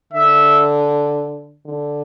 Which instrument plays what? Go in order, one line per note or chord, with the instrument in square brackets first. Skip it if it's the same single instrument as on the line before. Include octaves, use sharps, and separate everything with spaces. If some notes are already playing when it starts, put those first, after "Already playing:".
[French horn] D3 [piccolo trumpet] E5
[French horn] D3